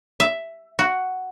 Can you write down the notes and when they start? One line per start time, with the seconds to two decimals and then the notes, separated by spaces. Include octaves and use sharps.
0.20 E5
0.79 F#4